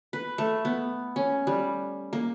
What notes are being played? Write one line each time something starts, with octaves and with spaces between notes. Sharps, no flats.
B4
A3
B3
C#4
G3
A#3